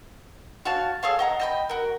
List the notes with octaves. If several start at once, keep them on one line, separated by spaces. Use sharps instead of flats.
F#4 C#5 F5 A5
G#4 A4 C#5 F5
D#5 F#5 A#5
D#5 G5 B5
F#4 A#4